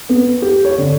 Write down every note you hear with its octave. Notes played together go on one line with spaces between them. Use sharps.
B3
G4
C#5
D3